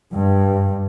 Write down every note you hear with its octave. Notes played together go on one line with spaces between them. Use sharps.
G2